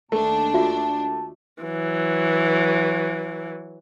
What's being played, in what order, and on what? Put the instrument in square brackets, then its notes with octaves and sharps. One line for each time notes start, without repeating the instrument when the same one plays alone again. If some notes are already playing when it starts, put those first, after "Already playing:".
[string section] D#2 D4 [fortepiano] A3 [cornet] A5
[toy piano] F4 F#4 E5
[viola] E3 F#3